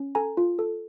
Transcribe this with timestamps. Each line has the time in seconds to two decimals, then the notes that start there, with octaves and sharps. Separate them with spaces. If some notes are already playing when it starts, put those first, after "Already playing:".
Already playing: C#4
0.15 A4 G#5 A#5
0.37 F4
0.59 A4